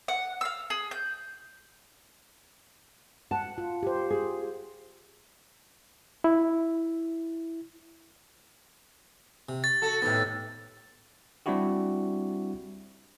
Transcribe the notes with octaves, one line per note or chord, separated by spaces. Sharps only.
F#5
F5 E6
G#4
G6
F#5 A5
F4
G4 C5
G#4
E4
C3
C#6 A6
F#4 A4
D#2 A2 C3 B3
G3 C4 D4 E4 F#4 G4